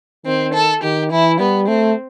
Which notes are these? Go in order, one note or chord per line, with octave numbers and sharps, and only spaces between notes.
D#3 C4
A4
D#3 G4
E3 E4
G3 B3
A3 C4